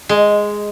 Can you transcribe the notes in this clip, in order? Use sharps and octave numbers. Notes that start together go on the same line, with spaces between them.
G#3